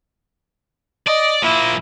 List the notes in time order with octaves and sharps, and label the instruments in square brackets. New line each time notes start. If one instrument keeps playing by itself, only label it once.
[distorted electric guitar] D5 [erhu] D#5
[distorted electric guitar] F3 A#3 [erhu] E4